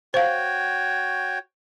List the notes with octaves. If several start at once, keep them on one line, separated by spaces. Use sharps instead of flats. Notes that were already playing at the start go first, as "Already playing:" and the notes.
F#4 C5 C#5 F5 G5